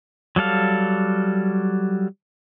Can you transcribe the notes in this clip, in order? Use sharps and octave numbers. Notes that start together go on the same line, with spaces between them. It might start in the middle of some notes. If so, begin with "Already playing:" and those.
F#3 G3 A4 F5